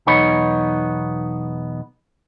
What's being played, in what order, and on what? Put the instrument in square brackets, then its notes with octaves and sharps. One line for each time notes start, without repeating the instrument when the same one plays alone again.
[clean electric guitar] B1 E2 B3 D#4 C#5 B5